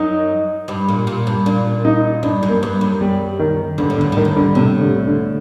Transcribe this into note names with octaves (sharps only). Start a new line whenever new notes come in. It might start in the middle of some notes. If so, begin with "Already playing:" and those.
Already playing: F#2 F#3 D#4
G2 G3
A#2
A#2
G2
A#2 D4
D#4
G2 D4
F#2
A#3
G2
F#2
G3
D#3
G2 D3
A2
D3
G2
A2 D#3
G2
D3
A2 C3
D3
D3